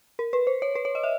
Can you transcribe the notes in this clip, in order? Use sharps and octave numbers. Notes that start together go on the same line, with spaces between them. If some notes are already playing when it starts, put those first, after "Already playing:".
A#4
B4
C5
C#5
B4
C#5
D#5
E5